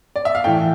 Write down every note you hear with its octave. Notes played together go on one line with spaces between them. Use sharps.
D5
E5
F5
A2 E3 G5